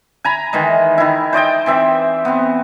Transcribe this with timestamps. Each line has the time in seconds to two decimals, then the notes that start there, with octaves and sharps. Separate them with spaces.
0.24 G#5 A#5 B5
0.53 D#3 E3 G#3
0.98 D#3 E4
1.33 C5 D5 D#5 G5
1.66 E3 C4 E5
2.25 B3 C4